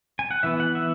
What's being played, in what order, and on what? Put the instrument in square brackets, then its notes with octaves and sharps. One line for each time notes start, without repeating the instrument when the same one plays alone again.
[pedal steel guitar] G#5
F#5
E3 B3 E5
F#5
E5